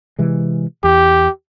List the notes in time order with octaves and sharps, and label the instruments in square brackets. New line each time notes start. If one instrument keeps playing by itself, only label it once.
[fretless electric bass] C3 E3 G#3
[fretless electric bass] E2 [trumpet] G4